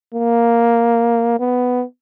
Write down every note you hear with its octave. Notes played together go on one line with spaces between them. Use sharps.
A#3
B3